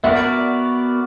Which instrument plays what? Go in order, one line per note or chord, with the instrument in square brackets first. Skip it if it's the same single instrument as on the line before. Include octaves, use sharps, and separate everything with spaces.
[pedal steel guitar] B3 F#4 A#4 D5 [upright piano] E5